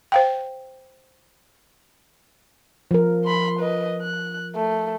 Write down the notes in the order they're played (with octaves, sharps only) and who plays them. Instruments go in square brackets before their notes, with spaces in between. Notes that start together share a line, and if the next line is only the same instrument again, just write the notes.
[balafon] C5 F5 G5
[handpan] F3 A#4
[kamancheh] B5 C6
B4 D#5
F#6
A3